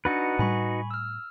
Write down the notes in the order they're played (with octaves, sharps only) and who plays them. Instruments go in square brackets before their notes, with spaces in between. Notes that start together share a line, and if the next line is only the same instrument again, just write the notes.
[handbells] D4 A6 C#7 [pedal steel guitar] D#4 F#4 B4
[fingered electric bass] A2 G3 [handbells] G#5 B5 C#6
[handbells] E6 F6